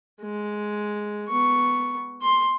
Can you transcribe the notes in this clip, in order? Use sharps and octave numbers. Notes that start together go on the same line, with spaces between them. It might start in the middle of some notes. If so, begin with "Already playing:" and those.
G#3
B3 C#6
C6